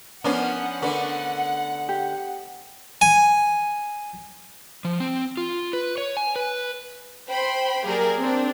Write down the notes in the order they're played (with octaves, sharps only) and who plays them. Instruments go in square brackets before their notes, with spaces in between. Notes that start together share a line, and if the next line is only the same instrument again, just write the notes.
[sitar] F3 C#4 D4 [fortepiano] B3 [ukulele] A#4 A#5 [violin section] F#5
[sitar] D3 A3 [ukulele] D4 A#4 B4
[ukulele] G4
[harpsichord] G#5
[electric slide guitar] F3
C4
F4
B4
C#5
G#5
B4
[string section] C5 G5 B5 C6
F#3 A#3 G4 G#4 A#4 D5
C4 D4